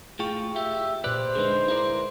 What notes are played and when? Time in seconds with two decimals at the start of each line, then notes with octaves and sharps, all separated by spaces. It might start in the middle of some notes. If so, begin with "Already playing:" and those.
0.19 A2 F4 G#4 G5 C#6
0.56 F4 G4 E5
1.04 A#2 G4 B4 C5 D5 F#6
1.35 D3 G#3 D#4 G#4 B4
1.68 E4 A#4 D5